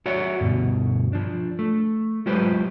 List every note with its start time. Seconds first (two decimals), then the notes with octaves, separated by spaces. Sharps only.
0.06 F#4 C#5 D5 E5 F#5
0.40 D2 G2 B2
1.13 F3 D4
1.59 A3
2.26 F#3 G#3 F4 G4 B4 C5